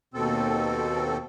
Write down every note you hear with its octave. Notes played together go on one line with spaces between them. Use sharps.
D#2 B2 C4 A4